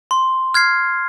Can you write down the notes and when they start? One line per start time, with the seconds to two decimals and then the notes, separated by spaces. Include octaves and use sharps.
0.11 C6
0.54 F6 G#6 C7